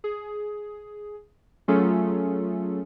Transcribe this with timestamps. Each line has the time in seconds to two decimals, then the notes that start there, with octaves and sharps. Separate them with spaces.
0.04 G#4
1.68 F#3 A3 C#4 F4 G#4 A4